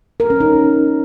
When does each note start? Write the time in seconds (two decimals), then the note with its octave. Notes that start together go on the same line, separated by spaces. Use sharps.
0.20 A#4
0.30 C#4
0.40 D#4